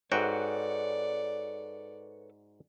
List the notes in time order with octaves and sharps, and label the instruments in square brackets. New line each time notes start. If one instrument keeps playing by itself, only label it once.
[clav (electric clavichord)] G#2 F#4 G5 [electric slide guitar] A4 B4 C#5 [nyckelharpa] D5